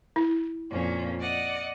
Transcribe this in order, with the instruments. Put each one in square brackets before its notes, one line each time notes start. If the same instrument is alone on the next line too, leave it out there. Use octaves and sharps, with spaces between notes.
[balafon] E4
[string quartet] F2 A#2 C#4
D5 D#5 F#5